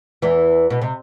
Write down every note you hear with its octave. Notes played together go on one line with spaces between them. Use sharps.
E2 E3
B2
C3